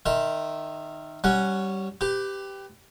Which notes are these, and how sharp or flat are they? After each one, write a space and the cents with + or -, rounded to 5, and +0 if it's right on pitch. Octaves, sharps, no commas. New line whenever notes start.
D#3 -15 E5 +0 C6 -15
G3 -20 C#4 +0 F#5 +0
G4 +0 B4 +25